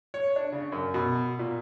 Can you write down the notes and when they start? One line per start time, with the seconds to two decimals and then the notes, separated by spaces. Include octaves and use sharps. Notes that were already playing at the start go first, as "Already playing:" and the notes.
0.14 C#5
0.36 D4
0.52 C#3
0.72 F#2
0.94 B2
1.39 A#2